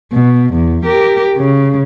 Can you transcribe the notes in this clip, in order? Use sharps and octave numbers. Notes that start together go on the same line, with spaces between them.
B2
E2
G4 A#4
C#3